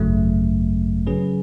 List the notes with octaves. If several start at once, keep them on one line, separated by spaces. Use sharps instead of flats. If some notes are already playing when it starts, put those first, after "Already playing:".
Already playing: G#1 F#2 C#3 F#3 A3
C#3 F#3 C#4 G#4 B4